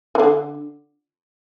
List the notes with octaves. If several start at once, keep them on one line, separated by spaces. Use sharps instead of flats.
E3
D3